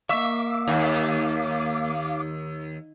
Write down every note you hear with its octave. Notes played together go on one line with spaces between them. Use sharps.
A#3 E5 F5 C#6 D6
D#2